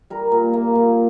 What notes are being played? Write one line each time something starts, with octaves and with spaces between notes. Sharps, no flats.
G3 A#4
A#2
A#3
A#2